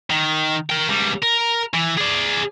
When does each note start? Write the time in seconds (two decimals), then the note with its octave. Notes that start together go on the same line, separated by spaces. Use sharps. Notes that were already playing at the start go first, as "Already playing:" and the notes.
0.10 D#3
0.70 A#4 G5
0.89 C#2 G3
1.22 A#4
1.74 E3
1.98 G#4 D5